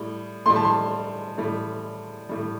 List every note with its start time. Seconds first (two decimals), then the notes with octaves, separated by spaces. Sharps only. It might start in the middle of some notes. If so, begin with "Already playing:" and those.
Already playing: A2 G3
0.46 A2 G3 C6
0.56 A5
0.65 C6
1.38 A2 G3
2.29 A2 G3